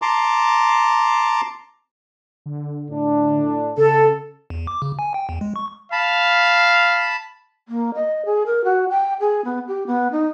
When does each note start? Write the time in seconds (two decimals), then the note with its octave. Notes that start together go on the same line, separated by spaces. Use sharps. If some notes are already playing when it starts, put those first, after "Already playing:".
0.02 A5 A#5 C6 D6
2.46 D3
2.89 A2 D4
3.77 C#3 A4
4.50 E2
4.67 D6
4.82 C#3
4.99 G#5
5.14 G5
5.29 E2
5.41 G#3
5.56 C#6
5.92 F5 A5 B5
7.68 A#3
7.95 D#5
8.25 G#4
8.46 A#4
8.64 F#4
8.90 G5
9.20 G#4
9.44 B3
9.67 G4
9.87 B3
10.12 D#4